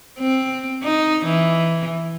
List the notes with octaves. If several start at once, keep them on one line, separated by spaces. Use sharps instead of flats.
C4
D#4
E3